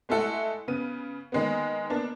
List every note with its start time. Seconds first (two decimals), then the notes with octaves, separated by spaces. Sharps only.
0.09 G#3 A3 E4 A4 F#5
0.68 C#3 B3 D#7
1.32 D#3 G#3 A#3 B3
1.90 A#3 B3 D4